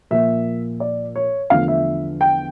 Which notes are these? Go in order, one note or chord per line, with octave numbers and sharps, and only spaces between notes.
A#2 F3 A#3 E5
D5
C#5
E2 D3 F3 A3 F5
E5
G5